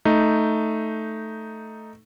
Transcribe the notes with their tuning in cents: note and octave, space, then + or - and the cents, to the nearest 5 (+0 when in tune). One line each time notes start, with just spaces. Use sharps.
A3 +0 D#4 +0